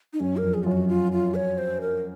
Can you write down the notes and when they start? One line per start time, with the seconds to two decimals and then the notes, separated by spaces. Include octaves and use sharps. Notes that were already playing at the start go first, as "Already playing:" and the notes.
0.13 D#4
0.20 F#2 C#4
0.37 A#4
0.43 F2
0.54 G#4
0.64 F#2 F4
0.72 F#4
0.88 F4
1.12 F4
1.35 C#5
1.58 C5
1.81 A#4